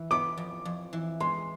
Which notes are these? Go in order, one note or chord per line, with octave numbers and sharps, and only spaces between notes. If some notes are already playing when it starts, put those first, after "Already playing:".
Already playing: E3
B3 D6
F2
F2
E3
G#3 C6